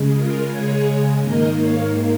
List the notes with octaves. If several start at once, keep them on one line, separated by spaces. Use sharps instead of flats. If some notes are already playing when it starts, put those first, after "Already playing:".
Already playing: C#3 G#3
F4 A#4
G#4 C#5
G#2 D#3 A#3 A#4 D#5
C#5 F5